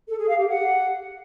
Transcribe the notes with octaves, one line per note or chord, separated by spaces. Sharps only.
A4
G#4
F5
G4
F#5